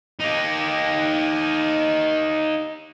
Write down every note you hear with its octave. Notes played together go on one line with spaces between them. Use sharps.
D#4 G4